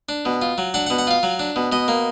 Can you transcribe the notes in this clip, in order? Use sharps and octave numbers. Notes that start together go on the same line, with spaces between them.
D4
B2
F4
F#3
D4 F#5
F#5
B2
F#5
F4 F5
F#3
D4
B2
B2 D#5
A#3